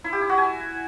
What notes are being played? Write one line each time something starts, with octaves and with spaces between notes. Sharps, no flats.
E4
G4
E4
F#4
G#5